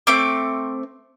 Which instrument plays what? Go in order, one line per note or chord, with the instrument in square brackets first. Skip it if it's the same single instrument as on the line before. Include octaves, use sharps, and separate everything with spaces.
[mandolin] A3 C4 D6